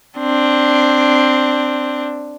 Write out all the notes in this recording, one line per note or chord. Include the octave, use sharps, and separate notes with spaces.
C4 D4